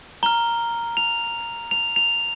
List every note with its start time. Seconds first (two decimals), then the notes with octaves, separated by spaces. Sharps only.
0.23 A#5 F6 G7
0.97 F7
1.71 F7
1.96 F7